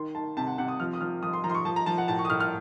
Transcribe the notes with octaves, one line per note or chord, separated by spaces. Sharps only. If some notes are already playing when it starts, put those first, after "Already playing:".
Already playing: D#3 C6
D#3 A5
C3 A5
F#5
C3 F#5
D#6
F3 F6
D#6
F3 F6
F3 D#6
C6
F3 A#5
C6
C#6
F3 A5
A#5
F3 A5
F#5
A2 A5
C#6
D#6
A2 F6
F6